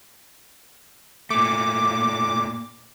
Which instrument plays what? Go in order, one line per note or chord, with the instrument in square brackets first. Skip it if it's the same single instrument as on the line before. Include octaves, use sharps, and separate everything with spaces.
[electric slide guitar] A#2 A3 [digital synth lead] D6